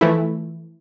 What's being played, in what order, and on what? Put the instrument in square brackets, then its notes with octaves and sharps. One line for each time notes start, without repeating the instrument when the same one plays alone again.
[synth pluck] E3 F3 A3 E4